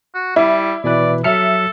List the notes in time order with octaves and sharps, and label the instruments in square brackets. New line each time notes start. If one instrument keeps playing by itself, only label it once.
[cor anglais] F#4
[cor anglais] G3 [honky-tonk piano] E4
[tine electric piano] B2 E3 B4 [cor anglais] D5
[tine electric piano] F#3 F6 C#7 [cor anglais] A4 [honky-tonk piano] E5